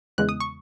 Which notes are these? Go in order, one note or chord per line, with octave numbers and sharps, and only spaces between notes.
E2 C#3 E3 G#3 F#6
D#6
C#6